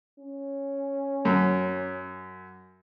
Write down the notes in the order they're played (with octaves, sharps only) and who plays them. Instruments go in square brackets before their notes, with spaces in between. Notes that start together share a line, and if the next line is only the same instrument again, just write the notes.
[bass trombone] C#4
[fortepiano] F#2